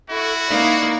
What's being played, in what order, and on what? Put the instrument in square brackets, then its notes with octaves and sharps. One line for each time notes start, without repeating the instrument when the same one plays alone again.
[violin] E4 [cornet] F#4 [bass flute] A4
[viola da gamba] A#3 D#4 [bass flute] D5